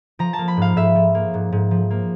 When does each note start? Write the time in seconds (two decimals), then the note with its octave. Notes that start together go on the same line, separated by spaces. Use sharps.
0.19 F3 A#5
0.33 A#3 A5
0.48 B5
0.57 G#2 F5
0.76 G#2 E5
0.95 F3
1.15 A#3
1.34 G#2
1.52 G#2
1.71 F3
1.90 A#3